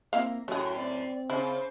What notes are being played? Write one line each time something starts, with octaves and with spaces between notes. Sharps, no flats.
A#3 C4 E4 F5
F#2 A2 A3 F#4 G#4 C#5
C4 D5
C#3 E4 C5